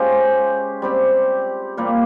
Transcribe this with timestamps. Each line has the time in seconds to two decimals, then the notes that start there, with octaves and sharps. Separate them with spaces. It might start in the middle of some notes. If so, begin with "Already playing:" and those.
Already playing: G#3 C#4 F4 G4 C5
0.82 G3 C4 G4
1.77 A#2 G3 A#3